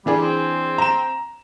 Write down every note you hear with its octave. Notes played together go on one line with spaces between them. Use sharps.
E3 G3 D4 G#4
C4
A#5 E7